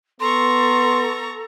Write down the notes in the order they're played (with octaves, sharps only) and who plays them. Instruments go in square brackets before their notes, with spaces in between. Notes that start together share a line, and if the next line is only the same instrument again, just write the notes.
[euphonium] B3 [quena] A4 [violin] A#5 C#6 [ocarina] C6